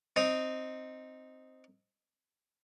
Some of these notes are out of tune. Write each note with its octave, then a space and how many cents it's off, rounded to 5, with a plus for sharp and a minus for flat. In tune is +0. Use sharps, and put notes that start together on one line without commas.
C4 +0 D#4 +0